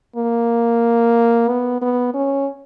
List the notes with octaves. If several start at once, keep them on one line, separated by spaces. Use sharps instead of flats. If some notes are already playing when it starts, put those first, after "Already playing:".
A#3
B3
B3
C#4